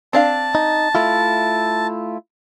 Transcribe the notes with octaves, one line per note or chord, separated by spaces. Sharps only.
C4 D4 F5 A5
D#4
A3 E4 F4